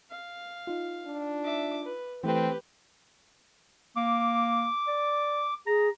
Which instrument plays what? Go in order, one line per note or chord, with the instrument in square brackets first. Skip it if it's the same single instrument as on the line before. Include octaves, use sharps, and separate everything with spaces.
[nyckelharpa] F5
[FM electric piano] D#4 F4
[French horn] D4
[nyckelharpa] E5 D6
B4
[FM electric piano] E3 A3 [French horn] C4 [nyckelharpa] G4 B4
[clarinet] A#3 [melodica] D6
[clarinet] D5
[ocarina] G#4 [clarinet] A#5